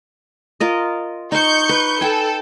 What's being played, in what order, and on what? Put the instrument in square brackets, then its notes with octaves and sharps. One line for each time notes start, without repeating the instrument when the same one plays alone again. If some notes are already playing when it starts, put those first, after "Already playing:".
[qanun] F4 A#4 D#5
[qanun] D#4 C5 [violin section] C#6 G6 C#7
[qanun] B4
[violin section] A4 [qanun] G5 G#5